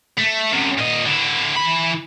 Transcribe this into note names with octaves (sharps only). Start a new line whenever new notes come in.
A3
F#2 C3
A#2 D#5
D3 E4
E3 B5